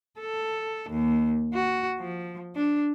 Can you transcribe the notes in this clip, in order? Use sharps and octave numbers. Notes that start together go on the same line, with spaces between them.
A4
D#2
F#4
F3
D4